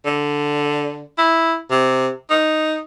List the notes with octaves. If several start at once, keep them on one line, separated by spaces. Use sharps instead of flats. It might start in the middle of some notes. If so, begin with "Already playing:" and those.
D3
E4
C3
D#4